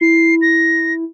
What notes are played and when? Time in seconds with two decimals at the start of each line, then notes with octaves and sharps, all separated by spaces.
0.01 E4 C7
0.42 A#6